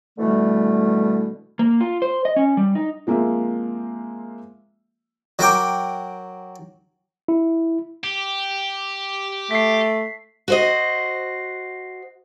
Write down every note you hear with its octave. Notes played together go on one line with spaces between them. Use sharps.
B2 D3 E3 G3 A3
A#3
F4
C5
D#5
C#4
G3
D#4
F3 G#3 A#3 C4 F4 E5
F#3 A#4 G5 D6
E4
G4
A3 B6 C7
F#4 C5 D#5